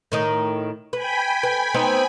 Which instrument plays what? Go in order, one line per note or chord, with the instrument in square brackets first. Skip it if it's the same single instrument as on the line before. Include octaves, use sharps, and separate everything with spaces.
[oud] A2 D#3 D#4
[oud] B4 [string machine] G5 G#5 B5
[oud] B4
B3 C4 D#4